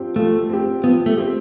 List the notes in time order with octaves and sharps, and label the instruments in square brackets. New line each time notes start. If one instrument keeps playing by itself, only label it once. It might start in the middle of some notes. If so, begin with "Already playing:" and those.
Already playing: [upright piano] F3 C4 G4
[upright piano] F3 [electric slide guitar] A3
[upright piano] C4 G4
[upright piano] F3 [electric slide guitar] B3
[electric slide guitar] A3
[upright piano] C4 G4